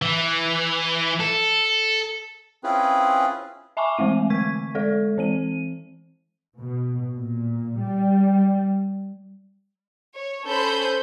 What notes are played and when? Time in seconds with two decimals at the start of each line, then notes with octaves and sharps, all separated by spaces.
0.02 E3
1.20 A4
2.64 C4 C#4 E4 F4 G#4 B4
3.77 E5 G#5 A5 B5 C#6 D6
3.98 E3 G#3 A3 C4 D#7
4.30 D3 C#6 G#6 B6
4.75 G#3 A4 D5
5.18 E3 C4 D#7
6.60 B2
7.14 A#2
7.80 G3
10.14 C#5
10.45 C#4 A4 C5 B5 G6